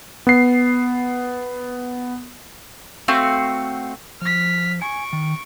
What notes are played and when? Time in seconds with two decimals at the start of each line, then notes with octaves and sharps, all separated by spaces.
0.27 B3 C7
3.08 A3 C4 F#4 F5
4.22 F3 F6 B6
4.82 G#5 C#6 D7
5.13 D#3